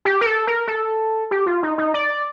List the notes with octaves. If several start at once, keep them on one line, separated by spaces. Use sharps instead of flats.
G4
A#4
A4
A#4
A4
G4
F4
D#4
D#4
D5